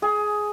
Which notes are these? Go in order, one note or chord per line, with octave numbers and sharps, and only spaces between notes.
G#4